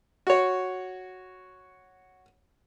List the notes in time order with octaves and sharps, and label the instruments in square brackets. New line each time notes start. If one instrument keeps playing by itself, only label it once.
[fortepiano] F#4 C#5